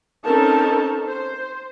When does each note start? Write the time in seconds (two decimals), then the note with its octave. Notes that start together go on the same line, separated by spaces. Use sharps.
0.24 C4 C#4 D#4 A4 A#4 A5
1.08 C5